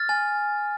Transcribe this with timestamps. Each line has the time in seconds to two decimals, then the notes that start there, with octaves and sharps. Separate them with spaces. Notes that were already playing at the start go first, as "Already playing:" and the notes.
Already playing: F6 A6
0.09 G#5